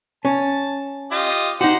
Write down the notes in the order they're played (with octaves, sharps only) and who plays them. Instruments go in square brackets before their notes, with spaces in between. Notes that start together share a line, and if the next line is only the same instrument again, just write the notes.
[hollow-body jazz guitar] C#4 [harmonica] A5
[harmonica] F4 G4 D#5
[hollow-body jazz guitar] D#4 F#4 [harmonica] G4 C5 F#5